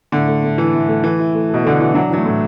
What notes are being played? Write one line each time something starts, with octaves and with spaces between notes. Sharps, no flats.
A2 D3
A3
A2
E3 E4
A2
A3
E3 A3
E4
A3
B2 A4
D3 A3
E3 E4
F#3 D4
E3 F#3
A3
A2